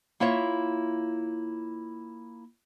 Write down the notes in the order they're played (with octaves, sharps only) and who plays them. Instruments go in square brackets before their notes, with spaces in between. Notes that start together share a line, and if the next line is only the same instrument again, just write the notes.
[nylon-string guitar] A#3 E4 F4 C#5 E5